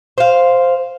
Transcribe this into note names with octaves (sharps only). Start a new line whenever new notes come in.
C5 F5